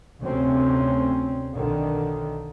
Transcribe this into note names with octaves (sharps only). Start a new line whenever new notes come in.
D2 C3 C4 C#4
B1 D3 D#3